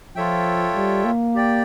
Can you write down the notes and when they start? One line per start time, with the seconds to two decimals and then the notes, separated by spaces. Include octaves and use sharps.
0.15 F3 F4 A4 C#5 E5 G5
0.75 G3
1.05 A#3
1.35 G4 D5 G5